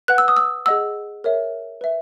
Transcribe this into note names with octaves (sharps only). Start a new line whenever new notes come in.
B4 F#5 F#6
E6
D#6
E6
G#4 D#5 F#5 E6
A#4 C#5 E5
B4 E5